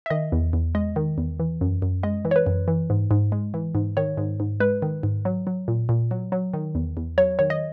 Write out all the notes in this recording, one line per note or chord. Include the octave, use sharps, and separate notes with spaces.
E5
D#3 D#5
E2
E2
G#3 D#5
D#3
E2
E3
F#2
F#2
G#3 D#5
E3
C#5
B4
F#2
E3
G#2
G#2
G#3
E3
G#2
D#3 C#5
G#2
G#2
G#3 B4
D#3
G#2
F#3
F#3
A#2
A#2
F#3
F#3
D#3
E2
E2
F#3 C#5
D#3 C#5
D#5